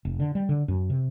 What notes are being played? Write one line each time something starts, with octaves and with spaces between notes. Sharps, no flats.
F1
D3
G3
D3
F#2
C3